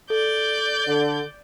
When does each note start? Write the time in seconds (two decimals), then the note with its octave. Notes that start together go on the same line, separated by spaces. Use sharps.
0.10 A4 D5 G6
0.87 D3